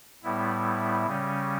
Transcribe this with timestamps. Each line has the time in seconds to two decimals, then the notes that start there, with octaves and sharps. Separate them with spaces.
0.23 A2 G3 B3 E4
1.06 C#3 G3 C#4